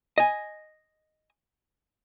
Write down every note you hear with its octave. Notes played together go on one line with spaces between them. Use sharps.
D#5 G#5